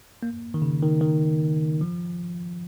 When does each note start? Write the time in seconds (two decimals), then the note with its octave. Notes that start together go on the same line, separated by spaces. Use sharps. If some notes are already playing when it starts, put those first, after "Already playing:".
0.23 A#3
0.54 D#3
0.62 C#3
0.82 D#3
1.01 D#3
1.81 F3